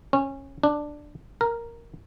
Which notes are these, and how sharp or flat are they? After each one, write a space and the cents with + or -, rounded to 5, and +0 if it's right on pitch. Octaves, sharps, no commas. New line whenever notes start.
C#4 -20
D4 +10
A#4 +0